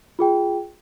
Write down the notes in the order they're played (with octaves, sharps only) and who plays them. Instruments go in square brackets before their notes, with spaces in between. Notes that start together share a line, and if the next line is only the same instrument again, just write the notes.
[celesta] F4 G#4 G5